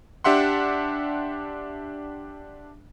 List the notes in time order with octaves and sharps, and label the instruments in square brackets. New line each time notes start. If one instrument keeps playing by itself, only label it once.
[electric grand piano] D4 G4 E5 F#5 C6